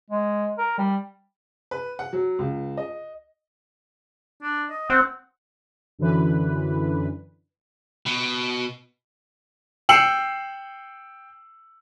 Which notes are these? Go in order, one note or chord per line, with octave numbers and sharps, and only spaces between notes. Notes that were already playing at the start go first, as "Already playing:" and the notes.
G#3
A#4
G3
B4
F#5
F#3
C#2
D#5
D4
D#5
C4 F#5
F#2 D3 E3 B4
B2
G5 E6 C7 C#7 E7 F#7